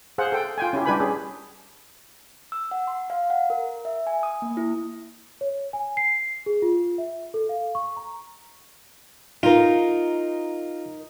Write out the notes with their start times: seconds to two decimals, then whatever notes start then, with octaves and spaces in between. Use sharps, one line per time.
0.18 G#4 C5 F5 F#5
0.32 A4 G5
0.58 F4 G5 G#5
0.73 C#4 E4 G4
0.86 G3 D4 G4 B4 G#5 B5
1.00 C#4 G#4
2.52 E6
2.71 F#5
2.87 C6
3.10 F5
3.30 F#5
3.50 A#4
3.85 E5
4.07 G#5
4.23 D#6
4.42 A#3
4.57 E4
5.41 C#5
5.73 G#5
5.97 C7
6.46 G#4
6.62 F4
6.98 E5
7.34 A4
7.49 F5
7.75 C#6
7.96 A#5
9.43 D#4 F4 A#4